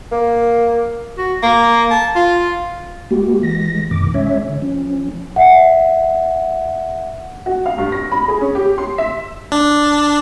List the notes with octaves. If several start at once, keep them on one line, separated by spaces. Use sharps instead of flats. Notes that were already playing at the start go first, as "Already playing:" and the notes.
A#3
F#4
A#3
A5
F4
G#3 A#3 F#4 G4
E3 G#3 A#6
F#2 B2 D#3 D6
G#3 C#4 C#5 E5
D3
F3 C#4
E5 F#5
F#4
F5
G2
A#6
B5
G#4
C#4
G4
C6
E5
D4